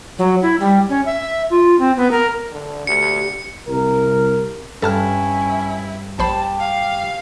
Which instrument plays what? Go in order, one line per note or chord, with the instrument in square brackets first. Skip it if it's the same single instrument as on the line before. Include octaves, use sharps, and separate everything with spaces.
[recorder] F#3
E4
G3
C#4
E5
F4
C4
B3
A#4
[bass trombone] D3
[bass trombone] D2 [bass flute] G4 [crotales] C#7
[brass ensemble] C2 A#4
[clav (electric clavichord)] G2 [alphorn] C#4 [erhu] E4 [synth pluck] A4 A5 F6
[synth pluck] A#1 C5 B5 [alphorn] G4 [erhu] A5
[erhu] F5